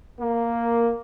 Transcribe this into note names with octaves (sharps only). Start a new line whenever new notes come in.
A#3